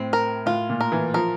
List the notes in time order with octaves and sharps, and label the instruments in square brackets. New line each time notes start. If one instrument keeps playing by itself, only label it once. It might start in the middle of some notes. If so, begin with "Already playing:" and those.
Already playing: [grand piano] A2 [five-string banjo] C4
[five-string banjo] A#4
[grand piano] A2 [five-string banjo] F4
[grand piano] A#2
[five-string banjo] A#4
[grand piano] E3
[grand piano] F3 [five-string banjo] A#4